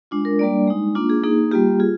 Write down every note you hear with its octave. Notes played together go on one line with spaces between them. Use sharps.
G#3 D4 F4
A#4
G3 A#3 D4 D5
G#3 D#4
A#3 D4 F4
G#4
A#3 D#4 G#4
G3 A#3 F4 G4
F4 G#4